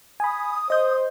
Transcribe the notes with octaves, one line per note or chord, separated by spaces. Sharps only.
G#5 B5 D#6
C5 D#5 G6